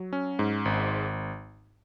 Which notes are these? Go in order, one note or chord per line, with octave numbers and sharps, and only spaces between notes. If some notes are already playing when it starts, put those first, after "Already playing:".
Already playing: F#3
C#4
G#2
G#1